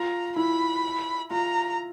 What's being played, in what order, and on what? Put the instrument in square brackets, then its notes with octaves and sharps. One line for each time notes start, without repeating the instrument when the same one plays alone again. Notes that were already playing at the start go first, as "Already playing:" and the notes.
Already playing: [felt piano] F4 [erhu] A#5
[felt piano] E4 [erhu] B5
[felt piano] F4 [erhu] A#5